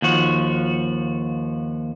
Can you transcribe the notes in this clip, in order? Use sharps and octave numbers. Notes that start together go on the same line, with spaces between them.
D#2 F3 F#4